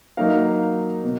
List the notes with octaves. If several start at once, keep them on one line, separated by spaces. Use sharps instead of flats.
F#3 A#3 D#4 A#4 F5
B2